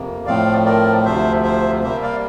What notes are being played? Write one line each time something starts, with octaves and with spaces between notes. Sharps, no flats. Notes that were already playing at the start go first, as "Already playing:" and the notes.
Already playing: F2 C3 A#3
A2 F3 A3 C4 D5 F5
A#4 D5
D2 C3 F3 C5 E5
C5 E5
C3 G3 A#3 C5 E5
D5 F5